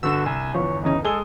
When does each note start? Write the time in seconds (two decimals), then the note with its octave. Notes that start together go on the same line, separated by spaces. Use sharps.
0.03 G1 D3 F#4 E6 E7
0.26 C2 G#5
0.54 G1 E2 F3 C#5
0.84 C#3 E3 C#4 D#4
1.04 G#3 G#4 A4 D#6 G7